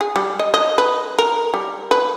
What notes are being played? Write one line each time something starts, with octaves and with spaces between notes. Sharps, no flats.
G#4
G3
D#5
D#5
B4
A#4
G3
B4